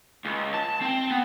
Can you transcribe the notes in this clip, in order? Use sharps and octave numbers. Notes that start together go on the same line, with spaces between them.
C#2
A5
C4
B3